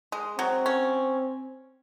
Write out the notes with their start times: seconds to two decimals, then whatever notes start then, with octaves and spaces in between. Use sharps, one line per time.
0.12 G#3
0.38 F#3 C4
0.66 C#4